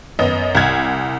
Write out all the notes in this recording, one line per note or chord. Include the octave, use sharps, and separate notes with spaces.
F#2 B3 D#5
C2 G#6